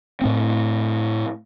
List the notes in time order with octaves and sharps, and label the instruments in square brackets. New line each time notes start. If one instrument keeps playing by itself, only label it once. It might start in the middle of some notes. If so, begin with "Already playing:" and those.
[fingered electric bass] A2 A3 C4